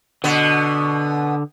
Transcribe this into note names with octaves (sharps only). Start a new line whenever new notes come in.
B2 D3 B3